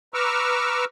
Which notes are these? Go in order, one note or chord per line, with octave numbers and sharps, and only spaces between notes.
B4 A#5 C#6 D6 E6 F6